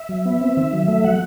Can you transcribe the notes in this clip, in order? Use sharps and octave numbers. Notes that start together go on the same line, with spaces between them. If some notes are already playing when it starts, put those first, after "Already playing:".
Already playing: E5
F#3
B3
C4
D#3
F#3
A3
F#3 F#5